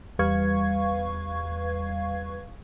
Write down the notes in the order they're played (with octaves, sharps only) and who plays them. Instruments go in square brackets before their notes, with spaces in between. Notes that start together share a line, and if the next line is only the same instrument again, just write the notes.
[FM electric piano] E2 G3 B4 F5 C#6 G#6